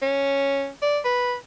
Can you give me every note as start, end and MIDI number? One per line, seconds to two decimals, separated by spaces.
0.02 0.69 61
0.82 0.99 74
1.05 1.34 71